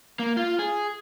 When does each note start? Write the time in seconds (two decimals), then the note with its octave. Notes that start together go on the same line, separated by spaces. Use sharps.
0.19 A#3
0.37 F4
0.59 G#4